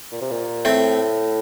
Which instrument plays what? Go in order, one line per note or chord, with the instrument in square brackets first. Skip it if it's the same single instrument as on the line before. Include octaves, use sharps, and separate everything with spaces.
[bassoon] A#2
C3
A#2
[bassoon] A2 [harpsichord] A3 C4